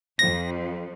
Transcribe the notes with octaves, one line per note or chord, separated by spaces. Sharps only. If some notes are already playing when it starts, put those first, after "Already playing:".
F2 A#6